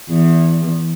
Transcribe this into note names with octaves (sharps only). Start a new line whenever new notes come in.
E2